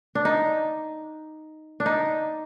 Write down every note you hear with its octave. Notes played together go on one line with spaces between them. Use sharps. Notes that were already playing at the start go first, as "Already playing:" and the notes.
D4
D#4
D4
D#4